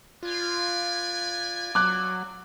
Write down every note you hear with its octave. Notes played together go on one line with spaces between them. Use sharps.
F4 B4 D5 G#5
F#3 D6 F#6